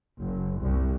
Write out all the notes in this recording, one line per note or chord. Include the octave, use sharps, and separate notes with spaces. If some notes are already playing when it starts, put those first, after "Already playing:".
F#1
C2